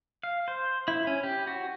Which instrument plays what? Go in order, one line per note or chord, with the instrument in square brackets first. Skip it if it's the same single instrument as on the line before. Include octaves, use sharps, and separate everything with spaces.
[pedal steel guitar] F5
C5
E4
C#4
G4
F#4